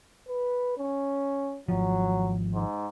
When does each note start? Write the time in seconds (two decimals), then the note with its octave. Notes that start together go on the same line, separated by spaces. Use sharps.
0.28 B4
0.78 C#4
1.69 G#1 F3 F#3
2.54 G#2